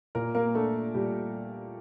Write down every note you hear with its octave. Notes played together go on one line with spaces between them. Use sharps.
A#2 A#3 A#4
A#3 A#4
A3 D4 A4
A#2 G3 G4